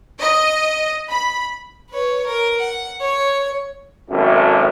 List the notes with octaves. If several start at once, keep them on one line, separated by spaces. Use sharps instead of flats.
D#5
B5
B4 C#5
A#4
F#5
C#5
G#1 F#2 A2 A3